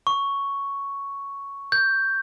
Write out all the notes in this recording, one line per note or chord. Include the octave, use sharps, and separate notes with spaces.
C#6
G6